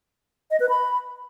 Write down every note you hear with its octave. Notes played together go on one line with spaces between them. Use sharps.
D#5
B4
B5